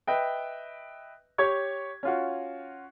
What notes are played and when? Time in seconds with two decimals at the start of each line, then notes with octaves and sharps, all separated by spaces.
0.07 B4 D#5 E5 G5
1.38 G4 C#5 C#6 G#6
2.03 C#4 F4 F#4